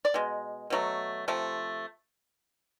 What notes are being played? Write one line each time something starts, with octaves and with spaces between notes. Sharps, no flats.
D5
B2 G#3
B2 F#3 A3
C3 F3 A3